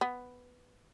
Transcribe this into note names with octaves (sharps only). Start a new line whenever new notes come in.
B3